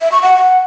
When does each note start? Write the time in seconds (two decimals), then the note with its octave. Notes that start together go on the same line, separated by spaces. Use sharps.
0.01 E5
0.12 C#6
0.23 F#5